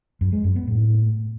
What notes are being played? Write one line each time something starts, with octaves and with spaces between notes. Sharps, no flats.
F#2
G#3
F#2
B3
A2